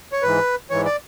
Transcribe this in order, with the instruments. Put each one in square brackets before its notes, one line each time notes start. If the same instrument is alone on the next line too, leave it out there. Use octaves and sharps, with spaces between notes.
[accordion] C#5
G#2 E3 B4
G#2 E3 C#5
D5